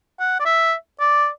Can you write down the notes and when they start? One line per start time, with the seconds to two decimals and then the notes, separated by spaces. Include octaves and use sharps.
0.20 F#5
0.40 D5
0.46 E5
1.00 D5